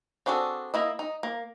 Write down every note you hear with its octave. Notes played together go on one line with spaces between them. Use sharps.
C4 D4 F#4 G#4 A4
A#3 E4 D#5
D#4
A#3